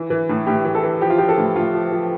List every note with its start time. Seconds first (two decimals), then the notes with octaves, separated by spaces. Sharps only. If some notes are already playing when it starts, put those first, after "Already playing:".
Already playing: E3
0.10 E3
0.29 A2
0.46 A2 G4
0.64 E3
0.75 A4
0.83 E3
1.01 F3 G4
1.10 F4
1.18 F3 G4
1.29 A4
1.38 A2
1.55 A2 F4
1.74 F3
1.92 F3